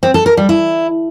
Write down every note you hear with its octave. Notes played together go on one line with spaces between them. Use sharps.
C4
A4
A#4
G3
E4